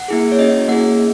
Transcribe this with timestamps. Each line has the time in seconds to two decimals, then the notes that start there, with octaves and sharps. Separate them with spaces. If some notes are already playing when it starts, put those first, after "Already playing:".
Already playing: F#5
0.08 A#3 E4 G#4
0.32 C#5
0.38 C#4 F#4 D#5
0.68 A#3 E4 G#4 F#5